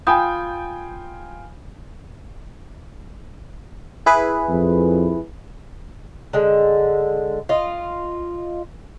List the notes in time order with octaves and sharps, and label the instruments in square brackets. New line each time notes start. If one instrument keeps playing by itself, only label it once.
[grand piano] F4 G5 G#5 [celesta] B5 D#6 G6
[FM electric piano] E4 G#4 B4
[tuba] F2
[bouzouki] D3 G#3
F4 D#5